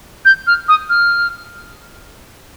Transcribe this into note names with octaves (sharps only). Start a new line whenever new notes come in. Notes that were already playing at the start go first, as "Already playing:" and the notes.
G6
F6
D#6
F6